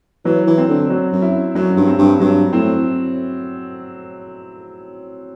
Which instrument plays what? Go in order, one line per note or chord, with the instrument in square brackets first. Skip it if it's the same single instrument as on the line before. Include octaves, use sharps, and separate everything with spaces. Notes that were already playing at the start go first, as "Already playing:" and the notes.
[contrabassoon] E3 [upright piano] F#3
[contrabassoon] E3
[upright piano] C4
[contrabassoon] D3
[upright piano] F#3
[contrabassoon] F#2
[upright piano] E4
[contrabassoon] F#2 [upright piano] F#3
[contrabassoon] G2
[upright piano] C4
[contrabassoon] G2
[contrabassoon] G2 [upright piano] F#3
[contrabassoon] A2 [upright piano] C4